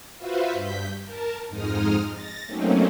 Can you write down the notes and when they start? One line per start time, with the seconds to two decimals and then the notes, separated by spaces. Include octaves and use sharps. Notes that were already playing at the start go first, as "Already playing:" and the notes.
0.17 F4 F#4 B4 C5 E5 F5
0.52 G2 G6 B6
1.05 A#4 A5
1.49 F2 G#2 G#3 D#4 D#6 F6
2.11 A6 A#6
2.46 F#3 A3 A#3 C4 C#4 D#4